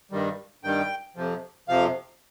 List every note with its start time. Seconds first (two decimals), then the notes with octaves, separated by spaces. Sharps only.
0.12 G2 D#3 G3
0.64 G2 D#3 G3 G5
1.16 F2 C3 F3
1.68 F2 C3 F3 F5